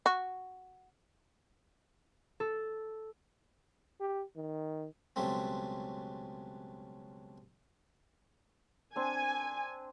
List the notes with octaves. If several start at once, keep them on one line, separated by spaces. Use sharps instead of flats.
F#4
A4
G4
D#3
C#2 B2 F#3 G3 A3 C4
C4 D4 G#5